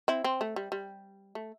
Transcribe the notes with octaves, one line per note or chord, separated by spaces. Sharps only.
C4 E4
C4
A3
G3
G3
A3